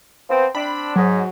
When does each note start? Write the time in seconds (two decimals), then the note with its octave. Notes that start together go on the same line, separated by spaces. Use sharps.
0.29 F3 B3 C4
0.55 C4 D4 B5
0.96 G#2 F#3